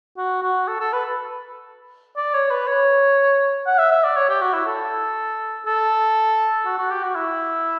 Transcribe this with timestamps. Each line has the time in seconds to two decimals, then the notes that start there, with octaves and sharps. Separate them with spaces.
0.17 F#4
0.43 F#4
0.68 A4
0.80 A4
0.93 B4
2.17 D5
2.34 C#5
2.50 B4
2.67 C#5
3.67 F#5
3.79 E5
3.92 E5
4.04 D5
4.17 C#5
4.29 G4
4.41 F#4
4.54 E4
4.67 A4
5.66 A4
6.66 F#4
6.78 F#4
6.91 G4
7.03 F#4
7.15 E4